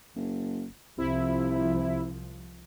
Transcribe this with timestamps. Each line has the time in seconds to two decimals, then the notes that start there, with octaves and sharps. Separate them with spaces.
0.16 F#1
0.98 C2 C3 F3 E4